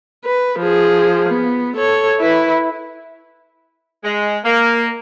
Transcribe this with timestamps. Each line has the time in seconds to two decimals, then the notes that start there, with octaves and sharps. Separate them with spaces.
0.25 B4
0.59 F3 G#4
1.29 B3
1.76 A4 C#5
2.20 E4 B4
4.04 G#3
4.44 A#3